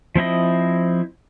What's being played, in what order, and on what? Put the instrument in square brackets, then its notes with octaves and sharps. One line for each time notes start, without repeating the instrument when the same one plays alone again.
[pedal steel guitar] F3 C4 E4 D#5